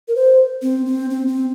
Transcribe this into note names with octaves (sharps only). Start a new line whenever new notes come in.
A#4
C5
C4
C4
C4
C4